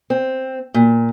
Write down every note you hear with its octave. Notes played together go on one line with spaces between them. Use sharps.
C4
A#2